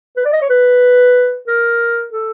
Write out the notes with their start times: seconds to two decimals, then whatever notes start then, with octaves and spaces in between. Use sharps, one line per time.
0.17 B4
0.25 D5
0.33 D#5
0.42 C#5
0.50 B4
1.48 A#4
2.12 A4